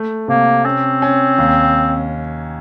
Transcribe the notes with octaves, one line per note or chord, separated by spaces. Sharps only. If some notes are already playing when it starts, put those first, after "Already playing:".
Already playing: A3
C3 A#3
C4 C#4
C#4
D#2